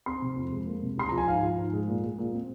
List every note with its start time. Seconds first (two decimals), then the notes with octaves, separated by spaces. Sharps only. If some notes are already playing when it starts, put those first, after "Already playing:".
0.06 C4 C6
0.22 C3
0.36 F2
0.52 G#3
0.67 A#3
0.82 C3
0.98 C2 C6
1.09 F3 A#5
1.18 G#5
1.27 G#2 F5
1.43 F3
1.58 G#2
1.73 G#3
1.88 A#2
2.03 G#3
2.18 A#2
2.33 C4